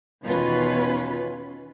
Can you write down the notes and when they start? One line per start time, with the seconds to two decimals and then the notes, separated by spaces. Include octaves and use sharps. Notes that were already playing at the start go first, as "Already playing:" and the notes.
0.22 E2 B2 D#3 C#4 F4 B4